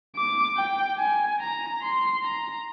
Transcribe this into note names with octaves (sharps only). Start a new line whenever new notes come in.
D6
G5
G#5
A#5
C6
A#5